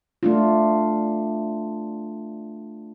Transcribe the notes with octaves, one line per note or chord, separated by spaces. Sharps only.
A3 D4 F4